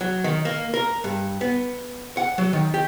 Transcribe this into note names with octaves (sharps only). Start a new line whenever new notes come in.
F#3
D#3
A#3
A#4
G2
B3
F#5
F#3
D#3
G4